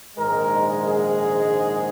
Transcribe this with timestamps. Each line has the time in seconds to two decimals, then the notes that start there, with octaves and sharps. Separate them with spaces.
0.17 A#1 G#2 D#3 G#3 A#4
0.89 G#4